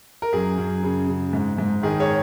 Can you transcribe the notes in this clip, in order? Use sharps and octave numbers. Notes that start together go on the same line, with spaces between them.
A#4
F#2 G#4
F#2
C#3
C#3
G#2
G#2
D#3 G#4
G#4 C#5